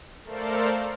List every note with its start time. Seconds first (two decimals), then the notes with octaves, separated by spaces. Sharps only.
0.24 A3 A4 A#4 C5 D5 F5